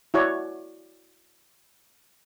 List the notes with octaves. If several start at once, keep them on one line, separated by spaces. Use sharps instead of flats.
E4 F#4 C#5 D5